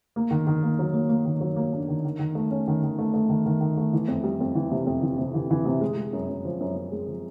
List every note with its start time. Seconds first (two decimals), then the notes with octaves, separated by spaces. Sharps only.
0.16 A#3
0.31 D#3
0.47 D#3
0.63 A#3
0.79 F#3
0.94 A#3
1.09 A#3
1.25 D#3
1.41 F#3
1.56 A#3
1.73 D4
1.88 D#3
2.05 D#3
2.19 D#3
2.35 A3
2.51 C#4
2.68 D#3
2.83 D#3
2.99 A3
3.14 A3
3.29 D#3
3.46 D#3
3.61 D#3
3.77 A3
3.93 E3
4.08 F2
4.24 G3
4.40 F2
4.55 E3
4.72 C3
4.87 F2
5.02 E3
5.18 C3
5.34 E3
5.51 E3
5.66 C3
5.81 G#3
5.97 G#3
6.13 F#2
6.29 F#2
6.45 F3
6.60 F#2
6.76 F#2
6.92 G#3
7.07 F3